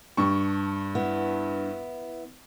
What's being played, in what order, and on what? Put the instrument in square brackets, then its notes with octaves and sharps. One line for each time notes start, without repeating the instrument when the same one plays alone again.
[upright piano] G2 C#6 [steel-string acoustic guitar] A5
[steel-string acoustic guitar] B3 E4